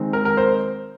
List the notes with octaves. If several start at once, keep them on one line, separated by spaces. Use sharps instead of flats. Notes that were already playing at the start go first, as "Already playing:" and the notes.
Already playing: D#3 G#3 C4 D#4
A#4
A#4
C5